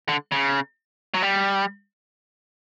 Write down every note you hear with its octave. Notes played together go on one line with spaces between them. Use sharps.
D3
C#3
F#3
G3